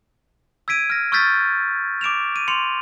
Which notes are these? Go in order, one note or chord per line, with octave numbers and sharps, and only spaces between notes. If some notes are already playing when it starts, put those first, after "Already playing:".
E6 G#6 B6 D7 D#7
F6 A#6
C#6 E6 F6 G6 A6 B6
D6 D7 E7 F7
D#7
C6 C#7 F7